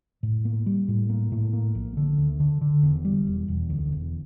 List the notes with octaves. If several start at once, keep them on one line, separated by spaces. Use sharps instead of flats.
A2
A#3
G3
A2
A#3
A2
A#3
A#1
D3
D2
D3
D3
E1
G3
E1
E1
D2
E1